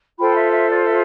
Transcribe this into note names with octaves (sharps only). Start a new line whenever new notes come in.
F4 A4 C5 G5 B5
E5
E5
D5
E5